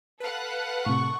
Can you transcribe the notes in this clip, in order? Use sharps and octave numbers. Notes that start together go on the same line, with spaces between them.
A4 B4 F5 F#5
A2 C3 C#6